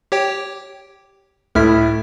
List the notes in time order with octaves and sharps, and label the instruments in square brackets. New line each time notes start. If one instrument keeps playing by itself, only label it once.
[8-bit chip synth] G4 C#5 G5
[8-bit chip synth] C#2 F6 B6 [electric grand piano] A2 E4